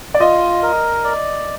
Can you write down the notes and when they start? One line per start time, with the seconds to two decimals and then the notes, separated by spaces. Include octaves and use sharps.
0.14 D5
0.20 F4 D#5
0.62 A#4
1.04 D5